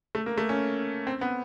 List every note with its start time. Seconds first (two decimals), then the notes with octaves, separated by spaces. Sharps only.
0.15 A3
0.26 A#3
0.38 A3
0.49 C#4
1.07 C4
1.21 B3